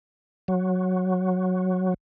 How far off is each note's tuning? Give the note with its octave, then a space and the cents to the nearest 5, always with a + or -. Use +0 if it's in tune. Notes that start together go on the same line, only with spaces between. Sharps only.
F#3 -5